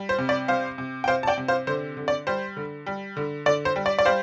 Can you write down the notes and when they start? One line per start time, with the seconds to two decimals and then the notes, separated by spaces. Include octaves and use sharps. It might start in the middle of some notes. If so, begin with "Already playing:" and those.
Already playing: G3
0.09 C5
0.18 C3
0.29 D5
0.48 C3 C5 F5
0.78 C3
1.04 G5
1.08 C3 C5 F5
1.23 A5
1.27 D5 G5
1.38 C3
1.48 C5 F5
1.67 D3 C5
1.97 D3
2.08 D5
2.27 G3 C5
2.57 D3
2.86 G3
3.17 D3
3.46 D3 D5
3.65 C5
3.76 G3
3.86 D5
3.99 D5
4.05 G3 C5 F5